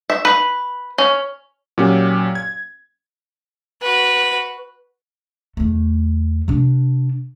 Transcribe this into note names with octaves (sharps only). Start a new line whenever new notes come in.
E5
B4
C#4
A#2 F#3 C#4 G4
G#6
F#4 B4
E2 A3
C3 D4